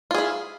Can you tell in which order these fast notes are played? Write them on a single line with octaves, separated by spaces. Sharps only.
F4 G#4 E4